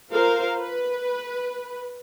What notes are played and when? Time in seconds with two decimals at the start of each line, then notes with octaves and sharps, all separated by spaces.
0.11 F4 A#4 C5 F5
0.59 B4